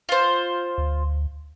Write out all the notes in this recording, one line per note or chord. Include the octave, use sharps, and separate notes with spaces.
F4 C5
D2